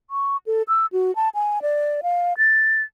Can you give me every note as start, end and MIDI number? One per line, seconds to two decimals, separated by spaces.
0.10 0.37 85
0.46 0.62 69
0.68 0.86 88
0.92 1.14 66
1.16 1.29 81
1.35 1.62 80
1.62 2.01 74
2.03 2.34 77
2.38 2.82 93